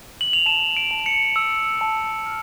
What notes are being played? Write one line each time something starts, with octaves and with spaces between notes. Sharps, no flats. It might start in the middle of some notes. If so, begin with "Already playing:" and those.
F#7
F7
A5 E7
D7
A5
C#7
E6
A5
F6